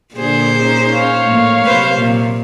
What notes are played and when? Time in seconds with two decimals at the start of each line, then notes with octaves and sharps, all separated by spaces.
0.15 A#2 D3 G#4 C5
0.59 C#4 D#4 G#4
0.92 C#5 F5
1.26 A2 F3 A#3
1.65 C3 F#3 B4 C5
1.95 A#2